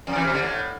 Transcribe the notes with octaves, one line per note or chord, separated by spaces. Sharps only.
F2
E3
C3
D3
A2